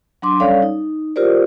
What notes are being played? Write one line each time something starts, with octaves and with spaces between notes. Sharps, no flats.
F#3 D4 C6 D6
G3 C#4 A4 C#5 D5 F5
D#4
F4 G4 A#4 C5 D5